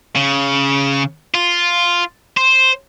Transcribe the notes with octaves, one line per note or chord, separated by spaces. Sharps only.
C#3
F4
C5